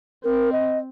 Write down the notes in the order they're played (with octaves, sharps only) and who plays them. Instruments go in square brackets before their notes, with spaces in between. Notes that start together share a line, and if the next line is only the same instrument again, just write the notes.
[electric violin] C4 [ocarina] A#4
[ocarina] D#5